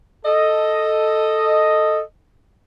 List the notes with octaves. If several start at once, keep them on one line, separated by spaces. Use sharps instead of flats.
A4 D#5